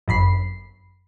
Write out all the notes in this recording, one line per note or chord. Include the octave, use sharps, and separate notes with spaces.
G1 F#2 B5 C7